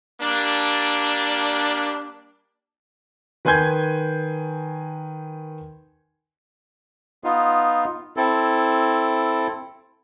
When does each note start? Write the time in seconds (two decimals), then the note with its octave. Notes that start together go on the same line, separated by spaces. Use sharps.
0.21 G3 A#3 D4
3.45 D#3 B4 G#5 C6 G6 G#6
7.24 B3 D#4 F4
8.17 C4 E4 A4